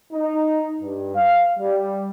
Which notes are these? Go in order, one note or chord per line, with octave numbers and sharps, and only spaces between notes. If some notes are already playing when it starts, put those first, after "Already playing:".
D#4
G2
F5
G3